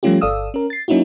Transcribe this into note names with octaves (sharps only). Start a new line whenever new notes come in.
F3 G3 A3 C#4 F4 G4
G1 A4 D5 F5 D#6 E6
C#4 A#4
A6 C7
F#3 A#3 C#4 D#4 E4 F#4